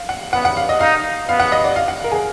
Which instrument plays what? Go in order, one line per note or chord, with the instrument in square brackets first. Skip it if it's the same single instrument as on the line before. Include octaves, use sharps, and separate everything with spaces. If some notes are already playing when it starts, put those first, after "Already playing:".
Already playing: [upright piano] F5
F#5
[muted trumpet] B3 [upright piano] F#5
[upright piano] F#5
F5
D#5
[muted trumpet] D#4 [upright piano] F5
[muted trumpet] B3 [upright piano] F5
[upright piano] F#5
D#5
D5
F5
F#5
A#4
G#4